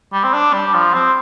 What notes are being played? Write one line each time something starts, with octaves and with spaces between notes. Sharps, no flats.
G3
C4
D4
G3
F3
C4